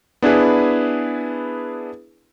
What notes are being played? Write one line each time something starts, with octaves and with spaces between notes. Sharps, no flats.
B3 D4 E4 G#4 B4